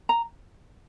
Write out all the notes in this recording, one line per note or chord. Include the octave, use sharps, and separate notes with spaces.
A#5